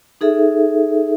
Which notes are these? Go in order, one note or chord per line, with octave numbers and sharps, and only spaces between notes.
D#4 G#4 A4 E5